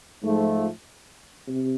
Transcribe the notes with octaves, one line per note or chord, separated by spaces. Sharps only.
G#2 F3 A3
C3